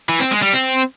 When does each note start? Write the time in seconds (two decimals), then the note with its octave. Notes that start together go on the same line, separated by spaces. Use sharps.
0.09 E3
0.20 C4
0.32 G#3
0.43 G3
0.54 C4